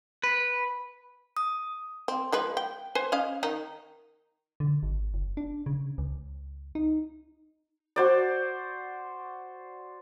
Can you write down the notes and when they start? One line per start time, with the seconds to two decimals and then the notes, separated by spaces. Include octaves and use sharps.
0.24 B4
1.37 D#6
2.08 C4
2.32 F3 G#3 B4
2.57 G5
2.95 B4 C5 G#5
3.12 C#4 D#5 F5
3.43 D#3 D#4
4.60 D3
4.83 G#1
5.14 F#1
5.37 D4
5.66 C#3
5.98 C#2
6.75 D#4
7.96 F#4 C5 D5